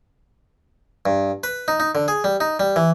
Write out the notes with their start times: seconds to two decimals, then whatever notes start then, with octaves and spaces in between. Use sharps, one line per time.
1.06 G2
1.44 B4
1.68 D#4
1.80 D#4
1.95 D3
2.08 G#4
2.24 G3
2.41 D#4
2.60 G3
2.76 E3